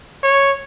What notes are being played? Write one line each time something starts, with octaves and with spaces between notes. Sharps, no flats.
C#5